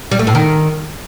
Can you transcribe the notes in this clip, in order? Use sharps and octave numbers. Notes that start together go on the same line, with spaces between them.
G3
A3
A2
D#3